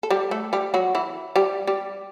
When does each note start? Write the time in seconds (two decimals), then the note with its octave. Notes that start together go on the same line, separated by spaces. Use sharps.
0.03 A4
0.10 G3 G4
0.31 A3 A4
0.53 G3 G4
0.74 F#3 F#4
0.95 E3 E4
1.36 G3 G4
1.67 G3 G4